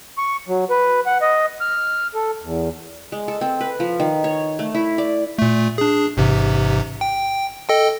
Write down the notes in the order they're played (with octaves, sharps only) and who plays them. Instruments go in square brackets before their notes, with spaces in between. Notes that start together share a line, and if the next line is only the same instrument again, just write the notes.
[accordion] C#6
F#3
B4
F#5
D#5
F6
A4
E2
[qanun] G#3
A4
C4
B4
F3
D#3
C#5
A3
E4
D5
[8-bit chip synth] A#2 A3
D4 G#4
A1 G#2 C3
G5
A4 D#5 G5